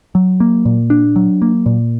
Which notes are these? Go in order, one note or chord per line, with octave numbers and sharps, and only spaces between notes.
F#3
A#3
A#2
D4
F#3
A#3
A#2